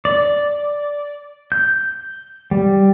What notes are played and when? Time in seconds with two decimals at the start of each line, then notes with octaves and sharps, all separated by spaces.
0.05 D5
1.52 G6
2.51 G3